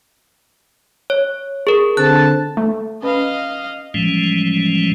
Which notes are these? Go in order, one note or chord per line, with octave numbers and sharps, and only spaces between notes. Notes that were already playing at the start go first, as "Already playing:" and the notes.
C#5
G#4 A#4
D3 C4 A5 F#6
A3
C#4 B4 D#5 F5 B5
A2 E3 F3 G3 G#3 C#4